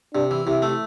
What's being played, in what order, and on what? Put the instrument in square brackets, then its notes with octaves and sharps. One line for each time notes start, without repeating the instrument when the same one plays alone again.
[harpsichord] C3 [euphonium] D4
[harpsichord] E3
[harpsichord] C3 [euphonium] E4
[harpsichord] A3